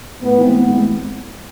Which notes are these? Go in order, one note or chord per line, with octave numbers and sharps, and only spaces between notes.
A2 B3
E3 G#3 C4
A2
E3 G#3 C4